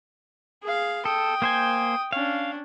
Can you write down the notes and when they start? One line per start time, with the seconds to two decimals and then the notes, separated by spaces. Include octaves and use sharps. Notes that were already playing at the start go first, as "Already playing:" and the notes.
0.63 G#4 F5
1.05 A4 G5 D#6
1.42 A#3 C5 G#5
2.13 C#4 D4 F5